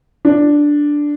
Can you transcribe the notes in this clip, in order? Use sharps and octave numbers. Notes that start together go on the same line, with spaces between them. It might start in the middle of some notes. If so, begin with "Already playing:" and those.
D4